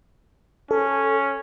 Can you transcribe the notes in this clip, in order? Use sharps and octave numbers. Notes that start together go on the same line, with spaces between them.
C#4 A4